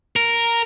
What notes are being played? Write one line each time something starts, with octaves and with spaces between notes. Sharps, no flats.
A#4